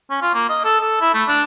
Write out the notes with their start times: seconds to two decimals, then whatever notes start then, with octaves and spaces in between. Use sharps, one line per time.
0.10 C#4
0.22 F4
0.34 A#3
0.49 D#5
0.65 A4
0.80 A4
1.01 E4
1.14 A3
1.28 D4